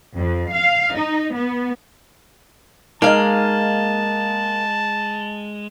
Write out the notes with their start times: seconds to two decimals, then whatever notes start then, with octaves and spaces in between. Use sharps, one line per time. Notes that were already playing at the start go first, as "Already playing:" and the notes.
0.15 F2
0.53 F5
0.96 D#4
1.34 B3
3.02 G#3 A#3 D#4 D#5 F5 A5